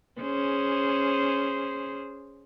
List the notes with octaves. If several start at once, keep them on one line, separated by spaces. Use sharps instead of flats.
C#4 G#4 C5